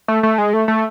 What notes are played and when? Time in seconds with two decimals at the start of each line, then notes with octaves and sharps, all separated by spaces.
0.08 A3
0.23 A3
0.38 G#3
0.53 A3
0.68 A3